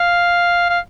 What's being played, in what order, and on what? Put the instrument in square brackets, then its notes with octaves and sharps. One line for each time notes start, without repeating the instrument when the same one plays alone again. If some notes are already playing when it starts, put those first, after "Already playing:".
Already playing: [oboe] F5
F5